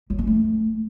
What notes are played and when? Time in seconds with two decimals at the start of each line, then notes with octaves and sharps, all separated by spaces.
0.10 F#3
0.19 C#4
0.27 A3